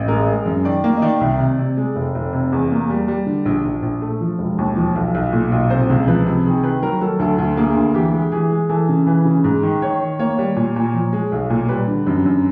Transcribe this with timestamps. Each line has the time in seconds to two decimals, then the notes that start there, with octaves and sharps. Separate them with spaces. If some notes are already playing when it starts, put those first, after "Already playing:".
Already playing: A1
0.08 G#3 A#4
0.28 G#3
0.46 F#2
0.65 D#3 D5
0.84 A#3
0.97 D#5
1.02 D#3 D5
1.21 C2
1.40 C3
1.59 C3
1.77 G#3
1.96 F1
2.15 F1
2.33 C3
2.52 E2
2.71 A#3
2.90 G3
3.08 G3
3.26 D3
3.45 A#1
3.65 A#1
3.82 A#1
4.02 A3
4.21 F3
4.39 E1
4.58 D#2
4.76 F3
4.96 B1
5.15 B1
5.33 A#2
5.52 B1
5.70 C3 C5
5.90 C#2
6.07 F3 B4
6.26 C3
6.45 D#3 G#4
6.63 D#3 B4
6.82 F#3 A#4
7.01 F#3 A4
7.19 D2 A4
7.39 D2
7.57 A#3 G#4
7.76 D2
7.94 E3 G4
8.13 G#3
8.32 E3 G#4
8.51 G#3
8.69 E3 A4
8.89 C#3
9.06 E3 B4
9.25 C#3
9.44 G#2
9.63 D#3
9.82 D#3 C#5
10.01 D#3
10.19 A#3 C#5
10.38 G3
10.56 A#2
10.76 A#2
10.94 F3
11.13 G#3
11.32 B1
11.50 A#2
11.69 G3 B4
11.88 D3
12.07 F#2
12.26 F#2